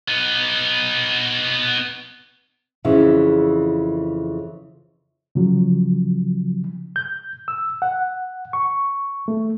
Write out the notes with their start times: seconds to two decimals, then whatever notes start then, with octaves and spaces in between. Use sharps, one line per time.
0.08 B3 D#4
2.85 F2 C#3 E3
5.35 C#3 F3 F#3
6.96 G6
7.48 E6
7.82 F#5
8.53 C#6
9.28 A3